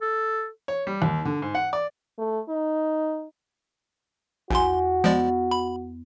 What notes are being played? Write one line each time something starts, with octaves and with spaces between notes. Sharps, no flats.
A4
C#5
G3
D#2
D3
G#2
F#5
D5
A3
D#4
A#1 E2 F#4 G#5 C6
F3 G#3 B3 D5
B5